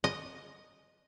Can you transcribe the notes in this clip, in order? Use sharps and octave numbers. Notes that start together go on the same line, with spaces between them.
D#5